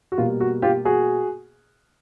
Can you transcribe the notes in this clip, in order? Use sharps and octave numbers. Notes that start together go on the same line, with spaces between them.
F#4
B2 G3 A#3 F4
F#4
F4 G4
F#4 G#4